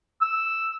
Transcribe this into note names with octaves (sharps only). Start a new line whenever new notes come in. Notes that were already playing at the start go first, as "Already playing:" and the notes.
E6